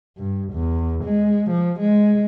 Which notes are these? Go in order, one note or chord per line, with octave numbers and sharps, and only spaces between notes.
G2
E2
G#3
F3
G#3